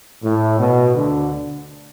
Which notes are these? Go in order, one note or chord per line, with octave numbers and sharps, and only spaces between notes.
A2
B2
D2 D3